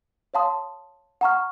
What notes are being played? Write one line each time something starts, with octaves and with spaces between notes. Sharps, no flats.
C#5 F5 A5 C6 D#6
F#5 A#5 C#6 F6